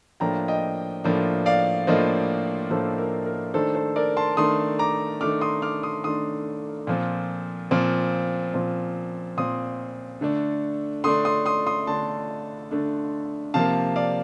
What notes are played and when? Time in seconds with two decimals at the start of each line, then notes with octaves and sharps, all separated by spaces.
0.20 A2 F3 A#3 D4 G5 A#5
0.48 D#5 G5
1.04 A2 F3 A#3 D4
1.46 D5 F5
1.87 A2 F3 A#3 D4 C5 D#5
2.70 A2 F3 A#3 D4 A4 C5
2.98 A#4
3.26 A#4
3.54 D#3 A3 D4 A4 C5
3.75 A4 C5
3.96 A#4 D5
4.17 A5 C6
4.37 D#3 A3 D4 C6 D#6
4.79 A#5 D6
5.21 D#3 A3 D4 D6 F6
5.41 C6 D#6
5.62 D6 F6
5.83 C6 D#6
6.04 D#3 A3 D4 C6 D#6
6.87 A#2 F3 C4
7.71 A#2 F3 C4
8.54 A#2 F3 C4
9.37 A#2 F3 C4 C6 D#6
10.21 D3 A3 D4
11.04 D3 A3 D4 C6 D#6
11.25 C6 D#6
11.46 C6 D#6
11.67 C6 D#6
11.87 D3 A3 D4 A5 C6
12.71 D3 A3 D4
13.54 C3 F3 A#3 F5 A5
13.96 D5 F5